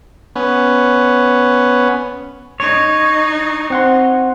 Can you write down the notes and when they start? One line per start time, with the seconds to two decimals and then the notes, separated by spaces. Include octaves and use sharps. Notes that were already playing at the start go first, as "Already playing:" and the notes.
0.36 B3 C#4
2.60 D#4 C#5
3.70 C4 F#5 C6